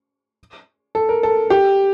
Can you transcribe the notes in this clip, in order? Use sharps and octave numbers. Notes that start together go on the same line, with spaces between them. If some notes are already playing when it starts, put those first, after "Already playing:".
A4
A#4
A4
G4